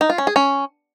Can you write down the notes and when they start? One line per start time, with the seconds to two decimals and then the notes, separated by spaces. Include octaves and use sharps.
0.01 D#4
0.10 F4
0.18 C#4
0.27 G#4
0.36 C#4